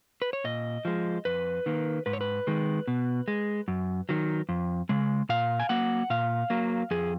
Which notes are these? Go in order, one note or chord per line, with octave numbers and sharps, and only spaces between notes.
B4
C#5
A#2 D#5
F3 G#3
F2 B4
D#3 A#3
G#2 B4
C#5
B4
D#3 G#3
B2
G#3
F#2
D#3 F#3
F2
C#3 G#3
A#2 F5
G#5
F#3 A#3 F#5
A#2 F5
F#3 A#3
F2 G#4